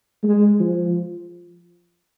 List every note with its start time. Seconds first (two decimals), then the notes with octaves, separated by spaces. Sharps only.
0.23 G#3
0.60 F3